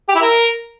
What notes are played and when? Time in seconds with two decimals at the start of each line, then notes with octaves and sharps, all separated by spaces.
0.08 G4
0.15 E4
0.21 A#4